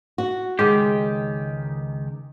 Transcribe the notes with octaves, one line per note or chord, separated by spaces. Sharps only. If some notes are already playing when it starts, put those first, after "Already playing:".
F#4
C#2 D#3 G#3 G4